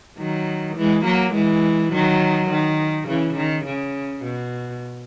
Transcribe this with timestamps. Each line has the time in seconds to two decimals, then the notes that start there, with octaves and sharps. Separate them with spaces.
0.18 D#3 F#3
0.76 E3 G#3
1.05 F#3 A#3
1.34 E3 G#3
1.92 D#3 F#3
2.50 D#3
3.08 C#3 E3
3.37 D#3
3.66 C#3
4.24 B2